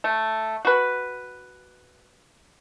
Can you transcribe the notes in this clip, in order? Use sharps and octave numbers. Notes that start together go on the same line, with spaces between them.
A3
F#4 B4